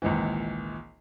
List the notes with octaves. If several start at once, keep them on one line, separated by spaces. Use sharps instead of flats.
G#1 C#2 A#2 E3